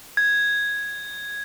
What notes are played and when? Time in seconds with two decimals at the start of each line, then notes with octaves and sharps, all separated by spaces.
0.17 G#6